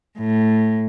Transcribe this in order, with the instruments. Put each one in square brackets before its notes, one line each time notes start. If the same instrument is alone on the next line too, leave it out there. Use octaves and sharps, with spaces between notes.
[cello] A2